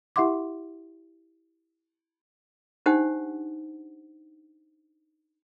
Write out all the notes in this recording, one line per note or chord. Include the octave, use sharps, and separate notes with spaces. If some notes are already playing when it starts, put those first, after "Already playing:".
E4 G4 E5 F#5 C6 D6
D4 D#4 G4 C5 F#5